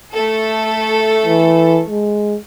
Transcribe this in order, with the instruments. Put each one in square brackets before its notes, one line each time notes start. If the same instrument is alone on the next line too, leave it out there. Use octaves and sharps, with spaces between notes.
[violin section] A3 A4
[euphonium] E3
G#3